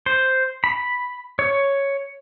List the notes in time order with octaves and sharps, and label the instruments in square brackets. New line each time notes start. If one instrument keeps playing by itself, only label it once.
[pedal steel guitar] C5
B5
C#5